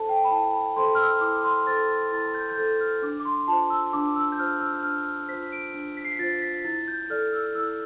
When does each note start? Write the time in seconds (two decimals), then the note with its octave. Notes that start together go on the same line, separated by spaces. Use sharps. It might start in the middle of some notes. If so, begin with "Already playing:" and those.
Already playing: E4 A4 C5 A5
0.09 G5
0.24 B5
0.31 E4 A5
0.54 B5
0.76 A4 C5 C6
0.95 F6
0.99 E6
1.21 E4 D6
1.44 C6
1.67 A4 C5 A6
2.12 E4 A6
2.34 G6
2.50 G6
2.58 A4 C5 A6
2.80 F6
3.02 D4 D6
3.20 D6
3.25 C6
3.48 F4 C5 A5
3.70 E6
3.93 D4 D6
4.16 E6
4.32 G6
4.39 F4 C5 F6
4.61 E6
4.78 G6
4.83 D4 F6
5.29 F4 C5 B6
5.52 D7
5.74 D4
5.97 B6
6.05 C7
6.12 B6
6.19 F4 A6
6.23 C5
6.42 B6
6.65 E4 A6
6.88 G6
7.10 A4 D5 F6
7.33 E6
7.55 E4 E6